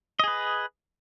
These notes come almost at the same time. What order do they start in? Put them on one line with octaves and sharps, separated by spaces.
D#5 G#4 B4